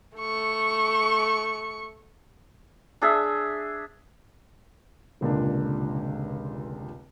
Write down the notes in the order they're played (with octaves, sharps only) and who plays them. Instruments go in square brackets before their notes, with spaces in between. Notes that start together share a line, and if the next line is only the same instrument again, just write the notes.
[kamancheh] A3 C#6
[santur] D4 G#4 E5
[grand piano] F1 C#2 A#2 D3 D4